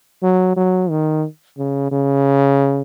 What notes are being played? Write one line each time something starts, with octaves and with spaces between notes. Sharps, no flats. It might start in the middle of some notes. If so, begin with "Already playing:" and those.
F#3
F#3
D#3
C#3
C#3